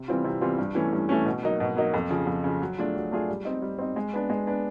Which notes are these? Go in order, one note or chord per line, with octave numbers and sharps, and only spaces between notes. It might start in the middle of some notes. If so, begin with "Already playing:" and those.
Already playing: C3
E3 G3 C4 F4
C3
E3 G3 C4 F4
G2
E3 A3 C#4
G2
E3 A3 C#4
B2
F#3 A#3 D#4
B2
F#3 A#3 D#4
F2
C#3 F3
F2
C#3 F3
F#3
A3 D4 F4 G#4
F#3
A3 D4 F4 G#4
G3
C4 D#4
G3
C4 D#4
G#3
B3 D4
G#3
B3 D4